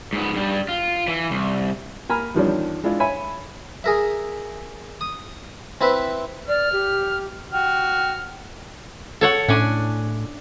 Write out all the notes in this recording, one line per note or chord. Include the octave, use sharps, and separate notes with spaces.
G#2 B3
G2 G3
F4
E3
C2
A#3 G#5 A#5 B5 F6
E2 D#3 F3 G3 C#4 D4
G#3 D4 E4 F4
C#5 E5 G#5 B5
G#4 A#4 E5
D#6
C4 E4 B4 E5
D5 F6
G4
F#4 G5 F6
A4 C#5 F#5
A2 C#4 D4 G#5